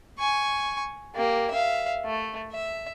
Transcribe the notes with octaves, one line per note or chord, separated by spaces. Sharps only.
G#5 C#6
A#3 G4
E5 F5
A3
E5